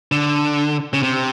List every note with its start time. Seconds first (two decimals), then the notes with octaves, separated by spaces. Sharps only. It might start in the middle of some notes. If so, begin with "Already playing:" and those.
0.12 D3
0.93 C#3
1.03 C3